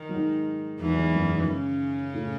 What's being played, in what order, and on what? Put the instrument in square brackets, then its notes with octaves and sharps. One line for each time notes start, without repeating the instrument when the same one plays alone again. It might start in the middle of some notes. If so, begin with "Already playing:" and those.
Already playing: [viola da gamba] D#3
[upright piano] F#3
G#2 G#3
[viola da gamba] E2 E3 [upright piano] G#2 G#3
[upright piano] F#3
G#2 G#3
F#2 F#3
D#3
[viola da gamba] C#3 C#4
[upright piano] A2 A3